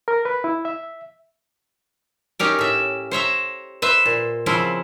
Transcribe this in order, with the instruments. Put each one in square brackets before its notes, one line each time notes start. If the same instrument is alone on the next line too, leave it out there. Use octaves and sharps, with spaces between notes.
[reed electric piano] A#4
B4
E4
E5
[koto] C#4 D#4 G4 A#4
A2 E5
C5 C#5 E5 A#5
B4 C5 E5
A#2
C#3 F3 C4 E4 C5